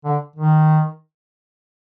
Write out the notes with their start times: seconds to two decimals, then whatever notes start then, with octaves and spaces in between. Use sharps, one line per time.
0.05 D3
0.36 D#3